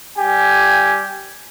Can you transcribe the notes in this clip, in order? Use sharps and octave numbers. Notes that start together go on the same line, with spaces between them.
G3 G4 G#5